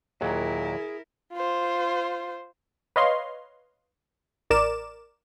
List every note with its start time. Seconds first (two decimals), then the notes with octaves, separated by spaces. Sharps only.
0.21 D#2 A#2 F#3 E4 G#4 A#4
1.32 F4 C5
2.96 B4 C#5 D#5 F5 C6
4.50 A1 A#4 D5 D6 E7